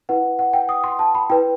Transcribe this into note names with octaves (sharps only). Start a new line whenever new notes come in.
E4 B4 F#5
F#5
G5
D#6
C6
A5
B5
E4 B4 G5